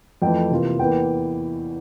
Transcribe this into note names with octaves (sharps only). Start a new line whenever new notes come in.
F2 E3 A3 G5
C3 E3 A#3 F4
E2 E3 A#3 G5